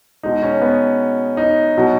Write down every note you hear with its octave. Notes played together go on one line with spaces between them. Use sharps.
B2 G#3 D#4
C#4
B3
D#4
B2 F#3